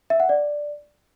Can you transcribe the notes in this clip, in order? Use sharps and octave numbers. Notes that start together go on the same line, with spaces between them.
E5
F#5
D5